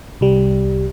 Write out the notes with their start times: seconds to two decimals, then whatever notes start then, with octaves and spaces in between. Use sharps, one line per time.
0.21 C2 G3